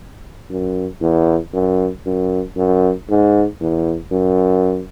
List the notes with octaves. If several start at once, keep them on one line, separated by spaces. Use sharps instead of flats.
F#2
E2
F#2
F#2
F#2
G#2
E2
F#2